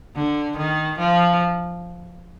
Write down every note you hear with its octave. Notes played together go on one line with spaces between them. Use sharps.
D3
D#3
F3